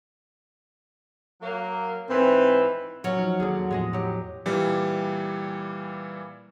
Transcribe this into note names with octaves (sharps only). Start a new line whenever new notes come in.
F#3 A#3
G#2 E3 C4
F#3 C#4 C#5
F3 D#4 F6
D#2 D3 G#4
E2 A2 F3 G#3 G#4 D#5
F#3 G4
A#2 E3 G3